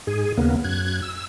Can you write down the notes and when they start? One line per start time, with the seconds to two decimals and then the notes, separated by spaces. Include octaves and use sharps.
0.07 G#2 G#4
0.37 D#2 C#3 A#3 B3
0.64 F#2 F#6 G#6
1.02 E6